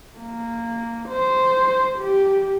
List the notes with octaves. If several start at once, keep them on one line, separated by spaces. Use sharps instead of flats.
A#3
C5
G4